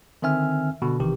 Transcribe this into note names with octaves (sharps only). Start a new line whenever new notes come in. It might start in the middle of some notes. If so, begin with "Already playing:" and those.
D3 D#3 C4 E5 G#5 F6
B2 D3
A1 C3 D#3 E3 G4